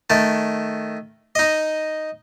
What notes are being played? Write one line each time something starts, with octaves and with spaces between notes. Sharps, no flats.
D#3 A3 A4
D#4 D#5